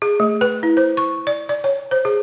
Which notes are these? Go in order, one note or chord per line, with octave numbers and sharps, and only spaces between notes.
G#4
A3
B4
E4
C5
C#6
D5
D5
C#5
C5
G#4